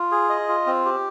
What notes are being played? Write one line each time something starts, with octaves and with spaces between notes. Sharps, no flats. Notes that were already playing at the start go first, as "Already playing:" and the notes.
Already playing: F4
G#4
D#5
F4
C4
G4